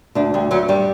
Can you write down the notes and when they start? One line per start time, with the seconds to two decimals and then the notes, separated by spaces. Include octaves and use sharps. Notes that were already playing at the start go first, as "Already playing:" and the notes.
0.15 D2 D4
0.34 D2 G3
0.51 D2 F#3
0.68 G2 G3